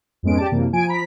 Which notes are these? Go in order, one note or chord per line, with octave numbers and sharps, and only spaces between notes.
F2 G#2 G#3 B3 C#4 D7
G4 D5 A5
F#2 C3 E3 A#3
F3 G#5 D7
F3 A#5 B5 B6